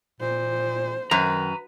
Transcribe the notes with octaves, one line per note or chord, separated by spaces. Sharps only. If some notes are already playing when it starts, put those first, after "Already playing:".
A#2 C5
F#2 D#3 B4 A#5